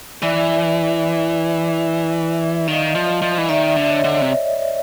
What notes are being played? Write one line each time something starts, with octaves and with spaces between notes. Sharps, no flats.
E3 D5 E5
D#3 D#5 F5
F3
F3
E3
D#3 D5 E5
D3
C#5 D#5
D3
C3